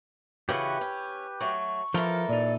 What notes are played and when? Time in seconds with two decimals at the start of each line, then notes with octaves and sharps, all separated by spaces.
0.49 C#3 E3 F#4 G4 B4
0.81 C#4
1.41 F#3 A3 C#6
1.94 E3 F3 F4 A4 A#4
2.29 A#2 D#4 D5